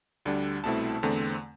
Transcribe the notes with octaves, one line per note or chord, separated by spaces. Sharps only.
D2 D3 G3 D4
C2 B2 A3 C4 E4 A5
E2 D3 A3 C4